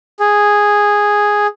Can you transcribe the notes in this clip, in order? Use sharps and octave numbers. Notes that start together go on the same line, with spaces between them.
G#4